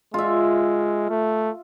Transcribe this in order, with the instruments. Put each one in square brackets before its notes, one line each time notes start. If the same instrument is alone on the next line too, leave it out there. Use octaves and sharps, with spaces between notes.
[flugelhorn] G#3 [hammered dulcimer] F4 E5
[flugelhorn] A3